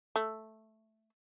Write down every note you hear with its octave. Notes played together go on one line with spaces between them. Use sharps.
A3